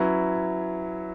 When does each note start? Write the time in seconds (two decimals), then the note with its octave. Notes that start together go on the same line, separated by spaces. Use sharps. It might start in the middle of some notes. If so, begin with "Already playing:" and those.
Already playing: F#3 C#4 E4 B4